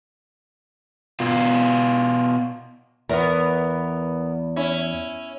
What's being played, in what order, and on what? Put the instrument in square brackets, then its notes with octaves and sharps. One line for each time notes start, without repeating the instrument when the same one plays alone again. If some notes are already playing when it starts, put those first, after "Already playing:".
[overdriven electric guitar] B2 F4
[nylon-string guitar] E2 [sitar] B3 A#4
[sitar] C#4 E4